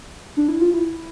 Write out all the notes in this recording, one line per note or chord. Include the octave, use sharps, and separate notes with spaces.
D4
E4
F4
E4